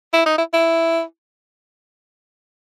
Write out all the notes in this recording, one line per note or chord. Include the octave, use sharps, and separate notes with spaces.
E4
D#4
E4
E4